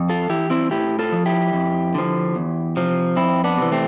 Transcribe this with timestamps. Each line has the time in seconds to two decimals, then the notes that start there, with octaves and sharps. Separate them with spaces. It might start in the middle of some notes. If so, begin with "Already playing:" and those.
Already playing: F2
0.10 F4 A4
0.29 E3 E4 G4
0.50 C4 E4
0.71 A2 E4 G4
0.99 F4 A4
1.12 F3
1.26 E4 G4
1.53 F2
1.94 D3 F3
2.35 E2
2.77 C3 F3
3.16 F2 C4 E4
3.44 B3 D4
3.58 C3 E3
3.72 A3 C4